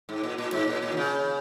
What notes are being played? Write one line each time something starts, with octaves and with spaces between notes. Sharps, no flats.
G#2
A#2
A#2
G#2
A#2
A#2
D#3
C#3